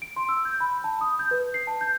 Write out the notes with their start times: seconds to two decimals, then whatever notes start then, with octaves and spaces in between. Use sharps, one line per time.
0.02 D7
0.16 C6
0.29 E6
0.45 G6
0.60 B5
0.84 A5
1.01 D#6
1.19 G6
1.31 B4
1.54 C7
1.67 A5
1.81 G6